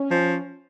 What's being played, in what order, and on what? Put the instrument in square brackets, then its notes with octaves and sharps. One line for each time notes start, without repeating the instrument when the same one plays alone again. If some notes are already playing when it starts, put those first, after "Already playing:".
Already playing: [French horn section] C#4
[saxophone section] F3